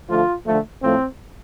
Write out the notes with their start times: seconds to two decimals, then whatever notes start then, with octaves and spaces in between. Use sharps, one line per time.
0.10 D3 F3 A3 F4
0.47 D3 F3 A3
0.82 A2 F3 A3 C4